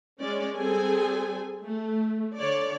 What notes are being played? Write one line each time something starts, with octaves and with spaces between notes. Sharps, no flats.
G#3 C#4 D5
G3 C4 G#4 A4 G#5
A3
D3 C#5 D5